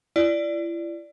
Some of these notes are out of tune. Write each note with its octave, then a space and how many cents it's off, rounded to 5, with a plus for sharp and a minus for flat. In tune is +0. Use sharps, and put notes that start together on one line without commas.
E4 +40 D5 +0